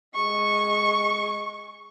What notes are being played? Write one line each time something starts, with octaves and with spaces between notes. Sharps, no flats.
G#3 C#6